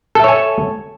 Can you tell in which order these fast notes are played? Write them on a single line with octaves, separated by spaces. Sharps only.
A4 E5 C#5 G#5